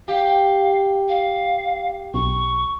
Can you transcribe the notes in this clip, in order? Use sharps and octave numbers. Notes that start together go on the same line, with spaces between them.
G4 F5
F5
B1 C#6